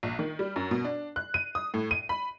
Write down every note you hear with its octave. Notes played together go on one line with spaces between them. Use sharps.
A#1
D#3
G3
F#2
B2
D4
F#6
D#7
D#6
A2
D#7
B5